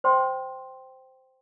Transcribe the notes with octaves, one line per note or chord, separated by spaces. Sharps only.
C5 G5 C6